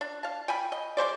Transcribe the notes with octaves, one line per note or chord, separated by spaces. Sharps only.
D4
F5 A5
G5 G#5 B5
D#5
G#3 C#4 C5 D5